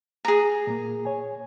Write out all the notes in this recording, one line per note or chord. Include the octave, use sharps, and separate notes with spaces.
G#4 A#5
A#2 A#3
C#5 G#5